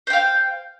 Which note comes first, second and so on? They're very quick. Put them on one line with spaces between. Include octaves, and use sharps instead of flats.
C5 G5 F5